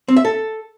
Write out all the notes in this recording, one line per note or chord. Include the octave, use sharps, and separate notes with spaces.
C4
E5
A4